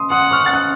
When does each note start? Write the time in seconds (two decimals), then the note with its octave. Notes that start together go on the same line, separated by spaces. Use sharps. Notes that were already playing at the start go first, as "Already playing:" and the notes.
Already playing: C6 D#6
0.10 F#5 C6 D#6
0.31 C#6 F6
0.46 A6
0.53 D#6 F#6